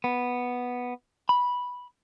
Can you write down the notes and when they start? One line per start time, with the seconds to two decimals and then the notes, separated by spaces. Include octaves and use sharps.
0.04 B3
1.29 B5